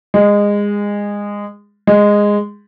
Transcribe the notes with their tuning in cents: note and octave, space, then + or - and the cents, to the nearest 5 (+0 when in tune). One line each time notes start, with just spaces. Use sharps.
G#3 -20
G#3 -10